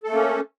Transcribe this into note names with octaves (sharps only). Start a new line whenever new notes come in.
A3 A#3 C#4 A4